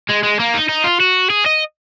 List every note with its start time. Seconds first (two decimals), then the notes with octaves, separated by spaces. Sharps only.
0.09 G#3
0.23 G#3
0.39 A#3
0.54 D#4
0.69 D#4
0.84 F4
1.00 F#4
1.30 G#4
1.46 D#5